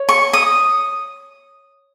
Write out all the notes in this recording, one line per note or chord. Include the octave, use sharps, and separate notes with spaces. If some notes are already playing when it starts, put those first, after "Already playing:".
Already playing: C#5
C#6
D#6